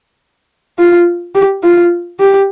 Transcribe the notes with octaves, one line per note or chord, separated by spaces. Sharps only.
F4
G4
F4
G4